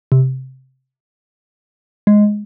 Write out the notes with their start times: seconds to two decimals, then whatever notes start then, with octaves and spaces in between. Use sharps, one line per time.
0.12 C3
2.07 G#3